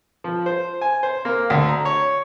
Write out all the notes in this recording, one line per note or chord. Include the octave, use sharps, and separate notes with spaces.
F3
C5
G#5
C5
A#3
D2
A#5
C#5